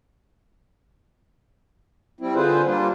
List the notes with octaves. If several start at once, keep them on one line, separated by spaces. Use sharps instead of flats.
G3 C4 E4
D3 F4 G#4 B4 C5
G3 A#3 D4 F4